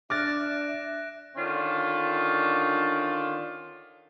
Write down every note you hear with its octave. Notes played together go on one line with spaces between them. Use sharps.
D4 E5 D6 F6 F#6 A6 A#6 D7
D3 D#3 C#4 D4 F4